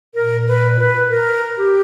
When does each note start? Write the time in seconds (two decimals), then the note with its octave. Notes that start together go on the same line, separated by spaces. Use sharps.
0.15 A#2 A#4
0.47 B4
0.78 B4
1.10 A#4
1.58 G4